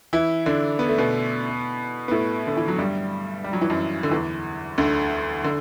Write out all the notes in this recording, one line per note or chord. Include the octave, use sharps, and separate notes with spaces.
E3 E4
D3 D4
B3
A3
B2 B3
B3
A2 A3
D3
E3
F#3
G2 G3
G3
F#3
E3
F#2 F#3
D3
E2 E3
D2 D3
D3